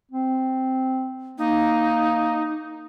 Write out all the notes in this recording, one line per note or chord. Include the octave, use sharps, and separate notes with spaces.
C4
A#3 D#4